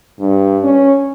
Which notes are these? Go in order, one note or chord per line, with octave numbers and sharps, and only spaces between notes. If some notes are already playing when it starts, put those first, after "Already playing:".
G2
C#4